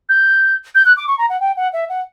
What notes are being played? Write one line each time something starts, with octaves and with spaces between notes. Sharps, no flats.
G6
G6
F#6
D6
C#6
A#5
F#5
G5
F#5
E5
F#5